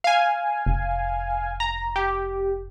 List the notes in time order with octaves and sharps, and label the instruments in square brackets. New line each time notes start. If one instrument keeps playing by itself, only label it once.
[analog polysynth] F5 G#5
[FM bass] F1
[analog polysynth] A#5
G4